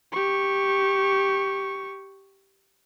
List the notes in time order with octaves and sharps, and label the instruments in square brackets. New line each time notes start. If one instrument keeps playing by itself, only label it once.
[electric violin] G4 C#6